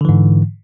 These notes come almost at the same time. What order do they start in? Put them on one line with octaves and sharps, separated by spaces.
D3 E3 G#2